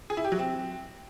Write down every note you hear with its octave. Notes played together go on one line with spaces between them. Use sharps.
G#4
E4
G4
F#3
C4